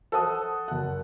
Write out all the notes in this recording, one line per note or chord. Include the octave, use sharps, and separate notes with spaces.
A4 C5 F#5 A5 D#6
F#1 F#5